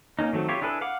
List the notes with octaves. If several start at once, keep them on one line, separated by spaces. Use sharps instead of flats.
A#3 C#4 D#4
D#3 F#3 A3 C4
E4 F4 G4 C#5
D4 E4 G#4 A4 B4
F5 F#5 D6